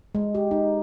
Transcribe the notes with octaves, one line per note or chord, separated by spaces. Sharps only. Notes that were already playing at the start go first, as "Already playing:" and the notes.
G#3
G4
D#4